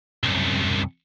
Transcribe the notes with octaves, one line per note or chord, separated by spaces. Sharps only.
C2 F#2